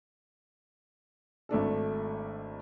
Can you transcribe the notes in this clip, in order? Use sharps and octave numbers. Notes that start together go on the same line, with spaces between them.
G#1 A3 D4 A4